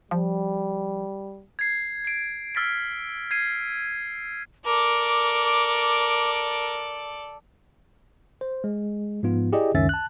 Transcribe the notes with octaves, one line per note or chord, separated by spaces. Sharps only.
F3 G3
G#6 C7
C7 D7
E6 F6 A6 B6 D7
G#6 C7 D#7
A4 A#4 D5 D6
C5
G#3
G#2 F3 B3 F4
E4 G4 G#4 D5 D#5
C#2 F#2 D#3 C#4 E5 A6
A5 F#6